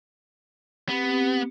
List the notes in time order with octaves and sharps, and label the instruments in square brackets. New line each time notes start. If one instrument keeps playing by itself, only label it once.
[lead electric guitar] B3 [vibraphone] C4 G4